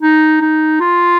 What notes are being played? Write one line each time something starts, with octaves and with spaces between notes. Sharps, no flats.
D#4
D#4
F4